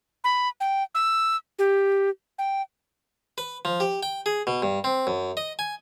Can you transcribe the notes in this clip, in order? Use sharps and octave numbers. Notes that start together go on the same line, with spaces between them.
B5
G5
E6
G4
G5
B4
F3
G4
G5
G#4
B2
G2
C4
F#2
D#5
G#5